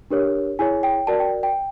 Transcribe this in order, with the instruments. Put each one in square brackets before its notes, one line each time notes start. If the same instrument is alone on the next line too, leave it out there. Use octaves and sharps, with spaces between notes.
[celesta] D4 G4 A#4 C#5
E4 G#4 C#5 G#5
G5
F#4 A#4 D5 A5
G5
G5